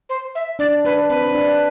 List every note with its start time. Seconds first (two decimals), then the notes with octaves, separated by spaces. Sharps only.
0.09 C5
0.35 E5
0.59 D4 D5
0.85 D4 B4
1.09 C4 B4
1.22 D4
1.35 D4